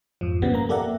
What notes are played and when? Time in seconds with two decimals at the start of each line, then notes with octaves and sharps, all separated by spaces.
0.21 F2 G#2 F3
0.42 G2 A#2 C#3 G3 B3 C4
0.54 A#3 A#5
0.69 A#3 G4 A4 D5 E5 F#5